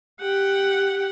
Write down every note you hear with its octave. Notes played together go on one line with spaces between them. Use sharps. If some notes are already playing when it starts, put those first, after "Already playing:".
G4 F#5